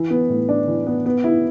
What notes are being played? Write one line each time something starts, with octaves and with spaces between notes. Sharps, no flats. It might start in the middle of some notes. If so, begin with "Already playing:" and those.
Already playing: E3
B3
A2
D4
E3
B3
B3
E4